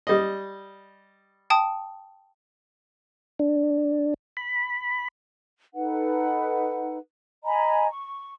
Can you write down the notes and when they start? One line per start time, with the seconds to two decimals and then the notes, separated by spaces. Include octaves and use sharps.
0.07 G3 D#5
1.50 G5 A5 D#6
3.39 D4
4.37 B5
5.74 D#4 A4 B4 F#5
7.45 D#5 G#5 A#5 B5
7.90 C#6